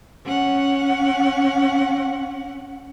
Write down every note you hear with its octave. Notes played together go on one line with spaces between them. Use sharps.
C#4 F#5